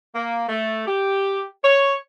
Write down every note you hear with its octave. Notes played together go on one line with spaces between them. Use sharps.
A#3
A3
G4
C#5